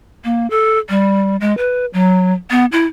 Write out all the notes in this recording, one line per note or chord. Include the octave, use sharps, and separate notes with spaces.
A#3
A4
G3
G#3
B4
F#3
B3
E4